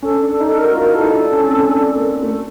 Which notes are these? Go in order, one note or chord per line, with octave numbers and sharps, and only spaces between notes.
C#4 A4
D4
A4
D#4
A4
A#4
F#4
F4 A#4
E4
A4
D#4
D4
C#4
C4
C#4
D4
A#3
A3 A4